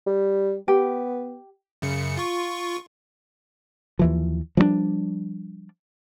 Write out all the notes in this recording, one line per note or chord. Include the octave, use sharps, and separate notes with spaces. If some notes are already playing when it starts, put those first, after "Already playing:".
G3
B3 G4
F#2 C#3 C#7
F4 C#6
D#2 E3 F3
F3 G3 A3 D4